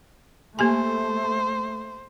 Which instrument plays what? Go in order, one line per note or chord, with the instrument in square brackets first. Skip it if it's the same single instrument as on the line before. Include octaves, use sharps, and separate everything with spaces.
[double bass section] A3 [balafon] A#3 G4 G#5 [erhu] C5